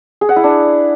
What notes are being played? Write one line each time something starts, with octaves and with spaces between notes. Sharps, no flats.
G#4
F#5
E4
D4